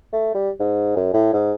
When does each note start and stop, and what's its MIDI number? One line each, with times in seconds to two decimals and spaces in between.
0.13 0.34 57
0.35 0.50 55
0.60 0.96 44
0.96 1.10 42
1.13 1.30 45
1.33 1.54 44